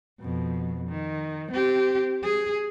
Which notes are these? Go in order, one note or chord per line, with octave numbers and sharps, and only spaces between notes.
F2 B2
D#3
C4 G4
G#4